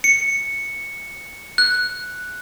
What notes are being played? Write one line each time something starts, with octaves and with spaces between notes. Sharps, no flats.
C#7
F#6